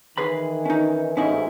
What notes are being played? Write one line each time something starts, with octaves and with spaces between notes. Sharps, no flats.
D#3 E3 G#4 B4 B5
C#4 D#4
A1 G#2 C#4 D#4 E4